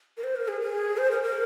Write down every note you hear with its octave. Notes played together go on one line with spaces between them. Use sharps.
A#4
C5
A#4
G#4
G#4
C5
A#4
A#4